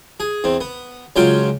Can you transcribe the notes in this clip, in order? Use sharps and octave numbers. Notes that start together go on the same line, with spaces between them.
G#4
E2 C4
B3
C#2 F#3 C#4 F4 G5 C6